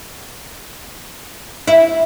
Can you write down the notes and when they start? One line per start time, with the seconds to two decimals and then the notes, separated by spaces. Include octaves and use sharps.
1.67 E4